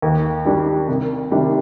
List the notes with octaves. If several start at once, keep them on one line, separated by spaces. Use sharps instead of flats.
D#2
D#3 G3 D4
C2
C3 D#3 G3 D4